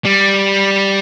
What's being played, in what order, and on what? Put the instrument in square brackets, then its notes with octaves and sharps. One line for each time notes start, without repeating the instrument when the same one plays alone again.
[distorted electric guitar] G3